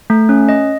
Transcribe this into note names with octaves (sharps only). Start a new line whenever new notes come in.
A3
C#4
D#5